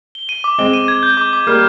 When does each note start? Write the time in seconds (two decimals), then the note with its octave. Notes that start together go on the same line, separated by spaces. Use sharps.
0.15 G7
0.29 D#7
0.44 D6
0.58 G#3 C4 G7
0.74 D#7
0.88 G#6
1.03 G6
1.17 D6
1.33 D6
1.47 G3 A#3 F6